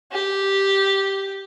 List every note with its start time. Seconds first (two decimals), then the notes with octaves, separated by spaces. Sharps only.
0.12 G4